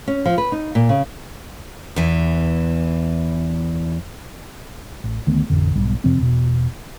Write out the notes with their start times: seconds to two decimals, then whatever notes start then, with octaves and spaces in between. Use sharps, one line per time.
0.08 C#4
0.26 F3
0.38 B4
0.52 D#4
0.75 A#2
0.89 C#3
1.96 E2 E3
5.04 A1
5.27 D2 D#3 A3 B3
5.50 A1 F2 D3
5.76 B1 G#2 G3
6.04 F2 C3 F3 C4
6.19 E1 B2